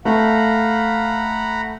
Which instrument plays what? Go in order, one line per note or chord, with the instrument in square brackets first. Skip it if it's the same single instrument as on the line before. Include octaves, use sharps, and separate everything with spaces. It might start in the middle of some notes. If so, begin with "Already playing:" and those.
[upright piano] A3 [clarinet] F5 [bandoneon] F#5 A#5 B5